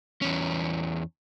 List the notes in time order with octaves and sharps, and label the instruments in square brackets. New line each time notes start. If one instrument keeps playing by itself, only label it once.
[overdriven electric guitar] E2 C#4